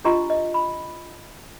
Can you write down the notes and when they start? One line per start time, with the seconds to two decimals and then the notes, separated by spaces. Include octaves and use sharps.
0.04 D4 F4 G4 D#5 A#5 C6
0.30 D#5
0.54 B5